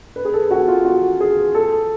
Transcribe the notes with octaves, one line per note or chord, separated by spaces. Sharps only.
B4
G#4
A4
F#4
F4
F#4
G#4
A4